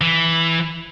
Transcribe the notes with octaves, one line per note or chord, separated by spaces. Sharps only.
E3